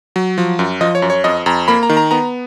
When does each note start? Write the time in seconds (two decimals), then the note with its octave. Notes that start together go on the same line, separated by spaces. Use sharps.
0.16 F#3
0.38 F3
0.59 F#2
0.81 F3 D#5
0.95 C#5
1.02 F#2
1.10 C#5
1.24 F2 D#5
1.46 F2 A#5
1.68 A#3 B5
1.83 A#5
1.89 D#3
1.97 A#5
2.11 B3 A#5